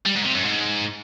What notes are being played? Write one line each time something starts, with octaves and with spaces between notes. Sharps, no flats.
G3
G#2
C3
F#2
G#2